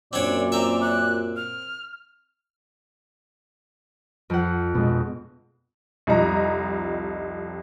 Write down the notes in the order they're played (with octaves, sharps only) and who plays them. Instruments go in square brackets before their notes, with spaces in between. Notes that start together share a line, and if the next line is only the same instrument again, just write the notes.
[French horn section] F#2 A#2 [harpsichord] C4 D4 C#5 [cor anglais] D5 [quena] F#5
[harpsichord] C4 E5 [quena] A#5
[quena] F#6
F6
[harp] F2 F#5
[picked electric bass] B2 G#3
[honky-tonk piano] C2 F2 F3 D#4 D#5 A#5